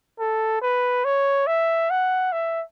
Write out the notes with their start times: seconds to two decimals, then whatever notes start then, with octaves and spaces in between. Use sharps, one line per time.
0.20 A4
0.62 B4
1.05 C#5
1.47 E5
1.90 F#5
2.33 E5